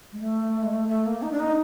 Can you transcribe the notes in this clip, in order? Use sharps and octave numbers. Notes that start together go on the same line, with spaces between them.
G#3
A3
G#3
A3
A3
A#3
D#4
D4
D#4